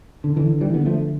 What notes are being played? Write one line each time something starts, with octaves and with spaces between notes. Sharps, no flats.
D3
D3 E3
E3 G3
D3 B3
F3 A3